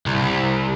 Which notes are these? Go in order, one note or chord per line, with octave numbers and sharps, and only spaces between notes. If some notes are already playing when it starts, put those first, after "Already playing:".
C2